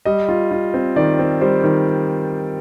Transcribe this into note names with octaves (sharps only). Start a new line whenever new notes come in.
G3 D#5
F4
F4
C4
D#3 D5
C4
G3 C5
D#3